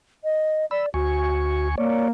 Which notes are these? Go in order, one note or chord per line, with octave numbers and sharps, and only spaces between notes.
D#5
D5 B5 E6
D2 F#4 G#5 C#6
A#3 C#5 D5